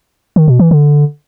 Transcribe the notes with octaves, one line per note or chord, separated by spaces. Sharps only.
D#3
B2
E3
D3